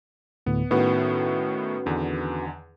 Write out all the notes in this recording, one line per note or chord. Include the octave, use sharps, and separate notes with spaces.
D2 A2 D3 B3
A2 D#3 B3 C#4 F#4 B4
E2 D3 D#3